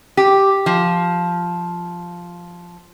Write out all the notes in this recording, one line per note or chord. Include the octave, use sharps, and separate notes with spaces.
G4
F3